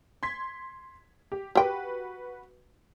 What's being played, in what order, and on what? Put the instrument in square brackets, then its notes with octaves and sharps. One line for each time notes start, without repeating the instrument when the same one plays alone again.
[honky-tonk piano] C6 G#6 B6
G4
[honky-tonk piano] F#4 B4 [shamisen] G4 G5